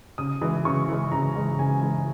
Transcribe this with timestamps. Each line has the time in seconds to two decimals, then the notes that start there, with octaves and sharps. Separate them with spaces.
0.18 C#3 D#6
0.41 E3 G#3
0.65 C#3 C#6
0.89 E3 G#3
1.12 C#3 A#5
1.36 E3 G#3
1.59 C#3 G#5
1.82 E3 G#3